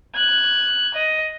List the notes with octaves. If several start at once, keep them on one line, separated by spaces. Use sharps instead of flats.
F#6 G#6
D#5